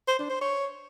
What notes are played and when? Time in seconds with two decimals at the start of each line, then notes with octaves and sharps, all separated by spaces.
0.08 C5
0.19 D4
0.30 C5
0.41 C#5